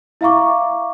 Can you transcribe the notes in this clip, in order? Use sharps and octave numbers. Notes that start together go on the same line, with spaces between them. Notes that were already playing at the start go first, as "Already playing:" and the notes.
E4 E5 F5 A#5 C#6 D6